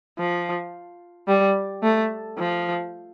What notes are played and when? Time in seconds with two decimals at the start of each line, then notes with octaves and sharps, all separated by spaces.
0.18 F3
1.28 G3
1.83 A3
2.38 F3